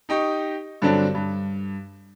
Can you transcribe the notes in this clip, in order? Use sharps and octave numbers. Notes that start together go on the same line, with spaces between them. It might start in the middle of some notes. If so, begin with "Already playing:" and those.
D#4 G4 D#5 C#6
G2 D3 F#3 C4 D4
G2